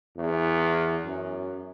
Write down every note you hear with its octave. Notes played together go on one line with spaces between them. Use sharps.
E2
F#2